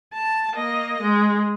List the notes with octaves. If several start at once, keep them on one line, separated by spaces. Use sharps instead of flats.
A5
A#3 D#5
G#3